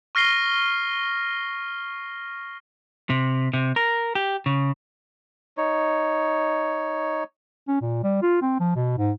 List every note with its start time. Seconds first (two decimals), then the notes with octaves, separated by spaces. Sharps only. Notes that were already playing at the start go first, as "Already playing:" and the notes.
0.15 C#6 F6 A#6 C7 G7
3.10 C3
3.53 C3
3.76 A#4
4.15 G4
4.46 C#3
5.57 D#4 C#5
7.68 C#4
7.81 A#2
8.04 G3
8.22 F4
8.42 C4
8.60 F3
8.75 B2
8.98 G#2